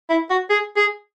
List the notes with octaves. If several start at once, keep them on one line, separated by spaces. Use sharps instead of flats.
E4
F#4
G#4
G#4